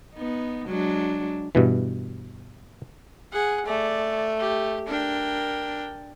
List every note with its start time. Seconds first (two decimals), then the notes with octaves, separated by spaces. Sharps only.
0.14 B3 D#4
0.67 F#3 G#3 D4
1.55 G2 B2 E3
3.33 G#4 F#5
3.66 A3 D5
4.39 G4
4.88 D4 A#4 G5